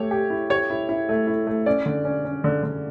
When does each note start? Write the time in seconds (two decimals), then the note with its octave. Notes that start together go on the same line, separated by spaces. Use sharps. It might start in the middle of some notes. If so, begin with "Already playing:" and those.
Already playing: A3 G4 C#5
0.11 G4
0.30 E4
0.50 G4 C#5
0.70 E4
0.89 E4
1.09 A3
1.27 E4
1.47 A3
1.66 C#4 D5
1.86 D3
2.05 C#4
2.25 C#4
2.44 D3
2.63 D3